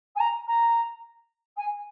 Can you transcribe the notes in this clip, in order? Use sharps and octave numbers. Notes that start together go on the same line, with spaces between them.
G#5
A#5
A#5
G#5